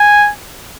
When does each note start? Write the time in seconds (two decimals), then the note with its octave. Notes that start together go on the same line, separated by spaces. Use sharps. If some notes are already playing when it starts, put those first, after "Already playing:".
Already playing: G#5